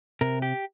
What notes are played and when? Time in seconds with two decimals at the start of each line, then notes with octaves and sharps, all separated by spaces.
0.21 C3 A#4
0.42 G4